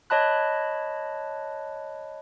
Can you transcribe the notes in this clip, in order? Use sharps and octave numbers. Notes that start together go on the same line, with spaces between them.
C#5 D#5 A5 B5 F#6